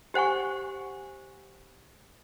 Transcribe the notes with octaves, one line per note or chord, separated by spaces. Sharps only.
G4 C5 F#5 G#5 C#6